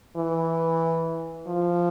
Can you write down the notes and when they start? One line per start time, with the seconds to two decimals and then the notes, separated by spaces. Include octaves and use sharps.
0.17 E3
1.47 F3